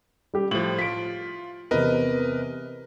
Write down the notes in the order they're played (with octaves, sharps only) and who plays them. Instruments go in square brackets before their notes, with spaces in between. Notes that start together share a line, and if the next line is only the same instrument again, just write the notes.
[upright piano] G3 G4
[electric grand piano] A2 F3 [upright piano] F#7
[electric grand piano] F4 [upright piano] B6 D7
[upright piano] E2 C3 [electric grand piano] A#4 B4 D#5